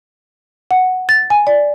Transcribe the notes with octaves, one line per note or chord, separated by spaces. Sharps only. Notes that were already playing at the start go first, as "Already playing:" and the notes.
F#5
A6
G#5
D5